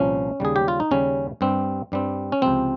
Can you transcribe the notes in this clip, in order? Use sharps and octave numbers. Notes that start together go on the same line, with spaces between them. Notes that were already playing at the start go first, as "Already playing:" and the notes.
Already playing: C2 A#2 F3 A#3 C#4
D#2 C#3 G3 G#4
G4
F4
D#4
D#2 C#3 G3 C#4
G2 G3 C4
G2 G3 C4
C#4
C#2 C3 F3 C4